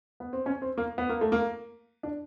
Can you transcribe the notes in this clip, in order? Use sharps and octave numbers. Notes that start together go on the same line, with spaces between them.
B3
C4
C#4
C4
A#3
B3
A#3
A3
A#3
D4